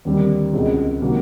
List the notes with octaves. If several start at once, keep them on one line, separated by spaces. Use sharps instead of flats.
D#2 D3 G3 C4
C#2 B2 G#3 C4
C3 D#3 F#3 A#3